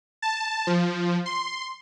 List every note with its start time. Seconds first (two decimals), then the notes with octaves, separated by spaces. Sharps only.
0.22 A5
0.67 F3
1.26 C6